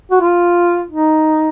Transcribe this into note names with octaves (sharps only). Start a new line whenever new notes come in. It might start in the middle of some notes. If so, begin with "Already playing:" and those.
F#4
F4
D#4